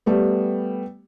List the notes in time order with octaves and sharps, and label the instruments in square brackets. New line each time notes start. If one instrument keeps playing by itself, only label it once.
[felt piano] G3 A3 B3